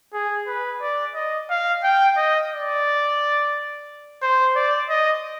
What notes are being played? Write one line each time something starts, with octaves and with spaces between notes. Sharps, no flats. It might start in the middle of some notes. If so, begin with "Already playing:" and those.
G#4
B4
D5
D#5
F5
G5
D#5
D5
C5
D5
D#5